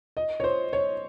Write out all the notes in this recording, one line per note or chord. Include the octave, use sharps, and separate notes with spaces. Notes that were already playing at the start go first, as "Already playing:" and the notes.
D#5
C#5
C5
C#5